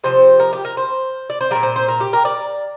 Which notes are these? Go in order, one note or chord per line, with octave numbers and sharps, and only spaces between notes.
C3 F3 C5
A#4
G4
A#4
C5
D5
C5
A#2 G3 A#4
C5
C5
A#4
G4
A#4
D5